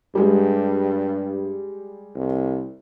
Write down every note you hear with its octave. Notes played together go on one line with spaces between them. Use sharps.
G2 G3 G#3
C2